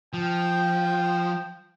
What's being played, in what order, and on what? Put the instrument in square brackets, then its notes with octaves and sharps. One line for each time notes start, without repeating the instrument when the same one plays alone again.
[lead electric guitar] F3 [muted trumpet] G5